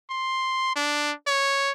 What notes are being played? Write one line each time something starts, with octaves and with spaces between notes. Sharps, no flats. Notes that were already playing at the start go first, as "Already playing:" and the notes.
C6
D4
C#5